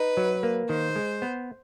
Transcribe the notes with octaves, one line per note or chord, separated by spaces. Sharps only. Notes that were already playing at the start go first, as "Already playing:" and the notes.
Already playing: D#4 B4
F#3
A#3
D#3 C5
G#3
B3